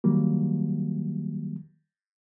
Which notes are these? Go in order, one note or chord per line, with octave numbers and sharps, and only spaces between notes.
D#3 F#3 G3 A#3